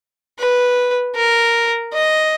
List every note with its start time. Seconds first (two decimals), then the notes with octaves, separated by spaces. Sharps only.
0.39 B4
1.15 A#4
1.93 D#5